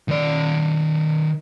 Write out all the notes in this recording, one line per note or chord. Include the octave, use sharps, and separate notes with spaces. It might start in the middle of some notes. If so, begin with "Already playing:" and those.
D#3 D5